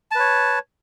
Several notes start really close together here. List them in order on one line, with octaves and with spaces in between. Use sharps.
A5 B4 C#5